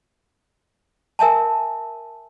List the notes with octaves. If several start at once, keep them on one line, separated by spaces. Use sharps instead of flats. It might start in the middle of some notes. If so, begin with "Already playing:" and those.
A#4 E5 G#5 A5